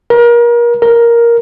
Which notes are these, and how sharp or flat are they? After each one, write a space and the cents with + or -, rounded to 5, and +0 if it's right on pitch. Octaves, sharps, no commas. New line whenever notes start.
A#4 +30
A#4 +5